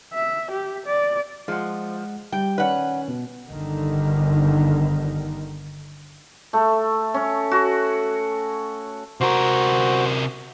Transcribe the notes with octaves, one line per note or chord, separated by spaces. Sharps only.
E5
G4
D5
F3 G#3 F#5
G3 G5
D#3 C#4 B4 D5 F#5
B2
G1 D3 D#3
A3
C#4
F#4
C3 F#4 A#4 C5